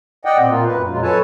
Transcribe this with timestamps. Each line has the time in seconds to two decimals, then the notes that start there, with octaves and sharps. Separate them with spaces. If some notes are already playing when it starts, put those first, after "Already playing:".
0.25 D5 D#5 F#5 G5
0.38 A#2 C4
0.50 A#2 A#3 F4
0.67 F#2 B4
0.90 F2 A#2 F#3 G#3 F4
1.03 A4 B4 C#5 G#5 A5